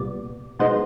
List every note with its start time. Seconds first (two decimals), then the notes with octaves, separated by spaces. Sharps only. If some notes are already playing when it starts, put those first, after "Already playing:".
Already playing: C2 A#2 G3 B3 D5
0.59 B2 G#3 B3 D#4 C5